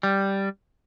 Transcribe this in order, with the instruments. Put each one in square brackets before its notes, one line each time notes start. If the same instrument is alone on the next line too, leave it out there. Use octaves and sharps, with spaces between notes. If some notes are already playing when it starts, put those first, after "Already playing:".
[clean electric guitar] G3